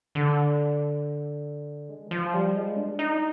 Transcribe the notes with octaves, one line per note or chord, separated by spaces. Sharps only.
D3
G#3
D#3
F3
G3
G#3
D4
D#4